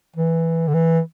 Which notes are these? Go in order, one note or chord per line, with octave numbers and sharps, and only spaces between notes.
E3
D3
E3